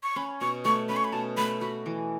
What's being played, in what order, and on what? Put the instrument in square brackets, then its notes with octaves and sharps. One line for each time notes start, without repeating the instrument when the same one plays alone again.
[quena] C#6
[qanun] C#4 [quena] B5
[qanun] B2 [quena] C#6
[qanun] A3 [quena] C#6
[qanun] C#4 [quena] B5
[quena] C#6
B5
[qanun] B2 [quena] A5
[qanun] A3 [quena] B5
[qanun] F#4 [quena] B5
[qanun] E3